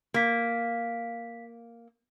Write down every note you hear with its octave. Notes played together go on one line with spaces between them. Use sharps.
A#3 F5 B6